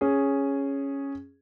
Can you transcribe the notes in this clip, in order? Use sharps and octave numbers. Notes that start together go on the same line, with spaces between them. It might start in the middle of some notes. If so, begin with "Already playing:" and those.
C#4 G#4